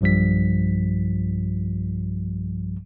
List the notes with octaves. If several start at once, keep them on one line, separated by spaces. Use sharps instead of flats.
B1 G2 F3 G3 B6